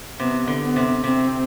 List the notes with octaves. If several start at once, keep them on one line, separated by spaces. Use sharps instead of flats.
C3 B3
D3
B3
C3
C3 C4